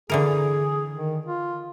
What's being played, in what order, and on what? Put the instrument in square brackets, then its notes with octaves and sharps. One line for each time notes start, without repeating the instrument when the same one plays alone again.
[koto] D3 E3 A#4 [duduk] G#4
[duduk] D#3
F4